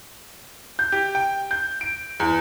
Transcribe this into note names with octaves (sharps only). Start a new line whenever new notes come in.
G6
G4
G5
G6
D7
E2